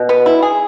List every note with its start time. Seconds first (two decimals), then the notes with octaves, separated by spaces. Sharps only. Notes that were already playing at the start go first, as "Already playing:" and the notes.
Already playing: B2
0.09 B3
0.26 E4
0.42 G#4